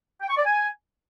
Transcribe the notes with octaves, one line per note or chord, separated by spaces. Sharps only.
G5
C#6
D5
G#5